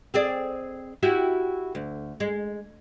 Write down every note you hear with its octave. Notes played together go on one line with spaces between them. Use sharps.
C4 G#4 D5
E4 F#4 G4
D2
G#3